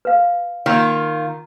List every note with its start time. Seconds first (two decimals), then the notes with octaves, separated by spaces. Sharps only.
0.05 B4 F5
0.66 D#3 A#3 F4